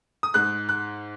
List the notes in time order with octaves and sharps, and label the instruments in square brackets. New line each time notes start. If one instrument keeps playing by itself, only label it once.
[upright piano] D#6
G#2 G#3 F#6
F#6